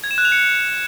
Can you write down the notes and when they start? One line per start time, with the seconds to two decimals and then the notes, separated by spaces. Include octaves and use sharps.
0.04 G#6
0.11 E7
0.18 F#6
0.25 F7
0.32 C#7